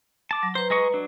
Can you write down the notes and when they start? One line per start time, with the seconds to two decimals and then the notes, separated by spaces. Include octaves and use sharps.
0.31 A5 D6
0.43 F#3
0.55 B4 C5 A#5
0.70 G#3 D#5 C#6
0.94 F#3 D4